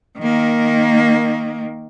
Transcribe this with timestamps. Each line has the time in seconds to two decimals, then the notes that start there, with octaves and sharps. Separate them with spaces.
0.19 D#3 A#3